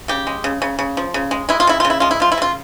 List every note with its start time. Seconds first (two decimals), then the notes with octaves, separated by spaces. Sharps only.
0.08 C#3 G4
0.27 G#3
0.44 C#3
0.62 C#3
0.79 C#3
0.97 F3
1.14 C#3
1.31 G#3
1.49 G#3 E4
1.60 F4
1.67 C#3 E4
1.80 C#3 F4
1.90 E4
2.00 G#3 F4
2.11 E4
2.20 F3 F4
2.32 E4
2.38 C#3 F4